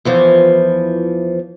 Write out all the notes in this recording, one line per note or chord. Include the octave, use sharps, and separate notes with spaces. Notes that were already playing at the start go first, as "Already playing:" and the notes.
E2 E3 F3